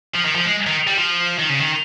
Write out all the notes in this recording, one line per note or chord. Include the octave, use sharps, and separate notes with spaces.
F3
D#3
F3
G#3
D#3
G3
F3
D#3
C#3
D#3